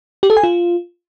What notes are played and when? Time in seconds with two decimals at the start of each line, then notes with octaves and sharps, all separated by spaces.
0.23 G4
0.30 A4
0.37 G#5
0.43 F4